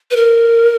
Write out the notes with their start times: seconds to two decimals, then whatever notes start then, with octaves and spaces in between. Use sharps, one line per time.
0.11 B4
0.16 A#4